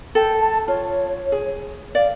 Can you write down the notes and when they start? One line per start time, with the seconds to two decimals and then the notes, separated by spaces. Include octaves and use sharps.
0.15 A4 G5
0.40 A5
0.68 F4 C#5
1.32 G#4
1.95 D5 F5